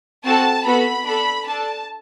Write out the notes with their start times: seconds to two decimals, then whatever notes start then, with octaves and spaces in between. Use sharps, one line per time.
0.24 C4 F#4 A4 A5
0.65 B3 F#4 A4 B5
1.05 D4 A4 B5
1.46 D4 A4 A5